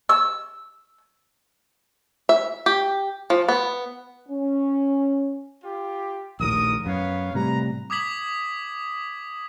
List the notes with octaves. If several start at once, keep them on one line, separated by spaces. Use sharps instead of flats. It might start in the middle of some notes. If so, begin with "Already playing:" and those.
E6
E5
G4
F3
B3
C#4
F4 G4
A#1 D#2 A2 A#4 D#6
F#2 B3 C#5 F5
A2 C3 G3 B4 A#5
D6 D#6 G#6 B6 F#7